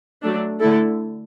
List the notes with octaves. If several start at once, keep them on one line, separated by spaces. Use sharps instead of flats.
F#3 A3 D4
D3 A3 E4 A4